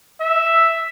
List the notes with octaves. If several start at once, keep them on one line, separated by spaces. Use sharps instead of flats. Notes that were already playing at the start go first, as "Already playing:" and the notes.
E5